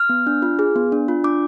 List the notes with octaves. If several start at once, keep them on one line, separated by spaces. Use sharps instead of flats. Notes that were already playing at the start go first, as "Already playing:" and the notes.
Already playing: F6
B3
D4
F4
G#4
B3
D4
F4
D4 D6